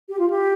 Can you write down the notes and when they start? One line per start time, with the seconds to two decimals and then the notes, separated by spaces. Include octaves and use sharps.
0.09 G4
0.19 F4
0.30 G4